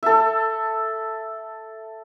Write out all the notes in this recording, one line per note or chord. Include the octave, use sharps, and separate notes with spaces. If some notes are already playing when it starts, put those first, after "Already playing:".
A4 E5